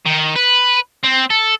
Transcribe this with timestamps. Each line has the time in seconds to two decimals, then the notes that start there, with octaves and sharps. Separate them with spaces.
0.06 D#3
0.36 B4
1.03 C4
1.30 A4